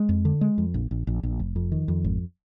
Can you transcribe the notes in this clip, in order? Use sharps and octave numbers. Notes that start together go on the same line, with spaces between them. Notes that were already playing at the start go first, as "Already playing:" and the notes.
Already playing: G#3
F2
D3
G#3
F2
A#1
A#1
A#1
A#1
F1
F2
D#3
F2
G#1